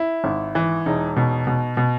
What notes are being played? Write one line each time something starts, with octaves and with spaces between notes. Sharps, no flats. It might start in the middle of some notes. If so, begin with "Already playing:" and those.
Already playing: E4
G#1
E3
E1 D#4
B2
B2
B2